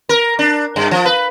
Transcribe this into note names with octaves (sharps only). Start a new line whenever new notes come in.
A#4
D4
G2
F3
B4